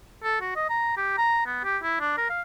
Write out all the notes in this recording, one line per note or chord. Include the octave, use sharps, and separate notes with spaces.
A4
F#4
D#5
A#5
G4
A#5
B3
G4
E4
D4
A#4
F5